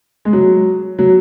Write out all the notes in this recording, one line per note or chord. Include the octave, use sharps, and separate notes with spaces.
G#3
F#3
F#3